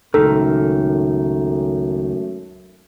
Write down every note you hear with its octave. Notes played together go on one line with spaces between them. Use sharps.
C#2 F#2 A#2 D#3 A3 A4